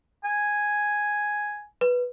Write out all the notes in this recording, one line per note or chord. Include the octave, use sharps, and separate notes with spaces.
G#5
B4